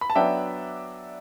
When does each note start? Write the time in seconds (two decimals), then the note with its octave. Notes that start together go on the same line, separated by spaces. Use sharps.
0.01 B5
0.10 A5
0.15 F#3 B3 D4 E5 G5